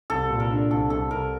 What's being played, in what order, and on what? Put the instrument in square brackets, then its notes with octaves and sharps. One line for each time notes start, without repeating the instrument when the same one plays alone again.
[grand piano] C2 [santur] A4
[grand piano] A#2
[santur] A#4
[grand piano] D4
[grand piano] C2 [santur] A4
[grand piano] C2 [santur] A4
[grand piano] C2 [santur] A#4